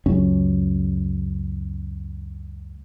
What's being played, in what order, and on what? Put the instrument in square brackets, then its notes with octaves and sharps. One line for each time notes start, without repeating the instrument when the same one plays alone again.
[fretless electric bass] C#2 F#2 C#4